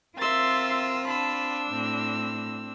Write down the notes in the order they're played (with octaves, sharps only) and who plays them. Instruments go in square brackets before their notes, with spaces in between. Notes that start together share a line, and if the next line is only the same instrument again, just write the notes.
[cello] C4 F4 [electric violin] A#4 E6 [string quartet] E5 C6 A6
[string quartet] D4 E6 [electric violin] A5 B5
[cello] A2 [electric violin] C4